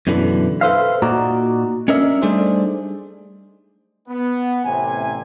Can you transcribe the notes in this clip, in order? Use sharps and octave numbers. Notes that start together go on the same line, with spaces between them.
F#2 B2 D3 E3
A4 B4 C5 E5 F5
A#2 D#4 F#4 D5 A#5
C#4 D4 A#4 D#5 E5
G3 A3 D4 D#4 G#4 C5
B3
A1 C3 G#5